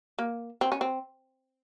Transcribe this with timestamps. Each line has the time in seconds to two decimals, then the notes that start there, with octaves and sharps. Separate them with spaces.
0.19 A#3
0.61 C4
0.72 C#4
0.81 C4